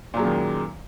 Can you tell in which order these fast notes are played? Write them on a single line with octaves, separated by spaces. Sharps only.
A#2 F#3 G#3 F#2 D#3